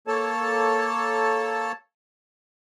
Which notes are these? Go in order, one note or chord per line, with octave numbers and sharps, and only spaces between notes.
A#3 A4 C#5 A5